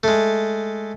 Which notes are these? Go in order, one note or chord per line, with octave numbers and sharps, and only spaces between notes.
G#3 A3